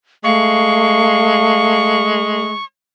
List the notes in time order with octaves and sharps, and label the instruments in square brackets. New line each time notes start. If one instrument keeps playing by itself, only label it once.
[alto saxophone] G#3 [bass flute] A3 [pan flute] F5 [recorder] C#6